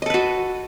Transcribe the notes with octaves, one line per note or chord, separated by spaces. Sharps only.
F#4 A4 B4 D#5